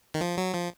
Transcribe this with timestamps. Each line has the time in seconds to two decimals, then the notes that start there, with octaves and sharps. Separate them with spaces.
0.14 D#3
0.21 F3
0.37 F#3
0.54 F3